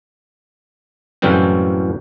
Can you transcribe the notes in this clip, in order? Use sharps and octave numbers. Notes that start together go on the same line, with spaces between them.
F#2 A2 C#3 E3 G3 C4